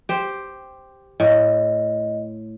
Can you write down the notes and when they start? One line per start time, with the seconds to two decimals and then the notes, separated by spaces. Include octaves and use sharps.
0.09 G4 C5
1.20 A2 D#5